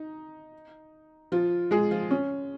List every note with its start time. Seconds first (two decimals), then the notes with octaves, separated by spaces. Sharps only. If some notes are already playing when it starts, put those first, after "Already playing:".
Already playing: D#4
1.32 F3 F4
1.71 G#3 G#4
1.91 F3 F4
2.11 C#4